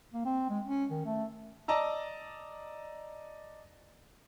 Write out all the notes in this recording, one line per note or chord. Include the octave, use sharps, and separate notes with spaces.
A#3
C4
G#3
C#4
D#3
A3
D5 D#5 A5 A#5 E6